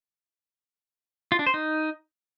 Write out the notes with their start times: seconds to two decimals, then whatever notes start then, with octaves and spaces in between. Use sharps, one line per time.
1.32 F4
1.39 D4
1.46 C5
1.54 D#4